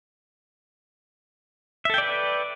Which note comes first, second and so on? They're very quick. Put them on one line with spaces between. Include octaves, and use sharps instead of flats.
E5 A4 G5 D5 B4